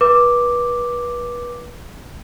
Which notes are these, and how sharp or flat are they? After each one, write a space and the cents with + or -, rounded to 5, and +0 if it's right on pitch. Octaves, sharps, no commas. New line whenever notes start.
B4 -30 D6 +0